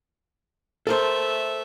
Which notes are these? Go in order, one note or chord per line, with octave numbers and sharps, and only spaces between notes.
A3 A4 A#4 C5 E5